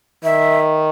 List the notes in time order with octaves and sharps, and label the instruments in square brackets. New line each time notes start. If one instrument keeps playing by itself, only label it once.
[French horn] D#3 [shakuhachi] E5